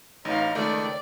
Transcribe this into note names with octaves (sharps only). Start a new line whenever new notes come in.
A1 D#4 F5
C#2 D#3 A3 D5